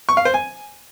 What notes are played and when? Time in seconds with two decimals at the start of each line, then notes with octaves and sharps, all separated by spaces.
0.09 C#6
0.17 F5
0.25 C5
0.34 G#5